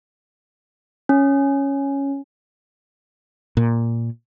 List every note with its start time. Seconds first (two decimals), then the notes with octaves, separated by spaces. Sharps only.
1.09 C#4
3.57 A#2